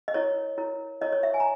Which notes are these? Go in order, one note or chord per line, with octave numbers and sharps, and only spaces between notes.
D#5
E4 A#4 C#5
E4 A#4 C#5
E4 A#4 C#5 D#5
C#5
E5
G#5
A#5